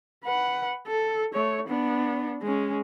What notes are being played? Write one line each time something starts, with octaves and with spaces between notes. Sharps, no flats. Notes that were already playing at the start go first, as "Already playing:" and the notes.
B4 F#5
A4
A3 C#5
B3 D4
G#3 C#4